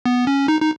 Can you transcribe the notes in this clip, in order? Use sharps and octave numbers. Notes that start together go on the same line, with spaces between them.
B3
C#4
D#4
D#4